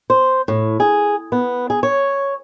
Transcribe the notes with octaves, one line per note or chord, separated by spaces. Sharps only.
C5
A2
G#4
B3
G#4
C#5